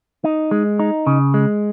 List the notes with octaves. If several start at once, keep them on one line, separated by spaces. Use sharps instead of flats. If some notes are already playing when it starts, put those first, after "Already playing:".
D#4
G#3
D#4
C#3
G#3